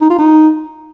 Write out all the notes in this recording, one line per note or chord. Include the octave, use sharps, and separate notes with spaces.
D#4
F4
D#4